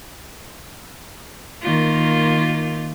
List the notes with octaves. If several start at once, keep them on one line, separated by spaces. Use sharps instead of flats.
D#3 A#3 F4